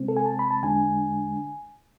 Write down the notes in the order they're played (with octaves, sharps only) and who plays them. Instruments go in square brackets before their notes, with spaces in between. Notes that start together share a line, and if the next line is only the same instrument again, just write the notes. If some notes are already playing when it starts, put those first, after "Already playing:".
Already playing: [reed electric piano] C3 G#3 C4
A4
G#5
A5
B5
A5
E2 D3 G#3 D4 G#5